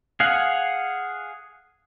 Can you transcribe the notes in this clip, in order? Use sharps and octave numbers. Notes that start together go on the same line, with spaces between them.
G#4 F5 F#5